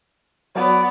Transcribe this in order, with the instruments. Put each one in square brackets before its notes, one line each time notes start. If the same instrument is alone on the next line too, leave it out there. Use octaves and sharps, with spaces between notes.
[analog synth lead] F#3 [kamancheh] B3 D5